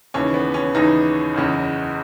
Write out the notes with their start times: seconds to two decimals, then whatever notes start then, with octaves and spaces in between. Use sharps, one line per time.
0.14 D#2 C#3 E3 C#4
0.34 B3
0.54 C#4
0.75 D#2 C#3 E3 D#4
1.35 F#1 E2 C#3